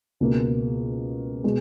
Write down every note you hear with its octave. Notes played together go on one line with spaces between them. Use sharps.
C#2 B2 A#3
B2 G#3